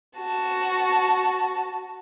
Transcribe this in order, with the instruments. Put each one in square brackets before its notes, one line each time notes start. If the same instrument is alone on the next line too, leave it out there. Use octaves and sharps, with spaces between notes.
[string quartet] F#4 A5